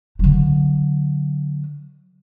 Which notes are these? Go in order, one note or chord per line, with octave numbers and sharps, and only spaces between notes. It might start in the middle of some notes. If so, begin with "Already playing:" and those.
D3 F#3